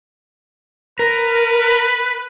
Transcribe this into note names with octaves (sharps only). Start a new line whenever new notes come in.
A#4 B4